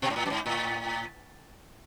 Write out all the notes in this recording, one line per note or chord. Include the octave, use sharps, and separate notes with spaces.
B2
G#2
A2
F#2
G#2
A2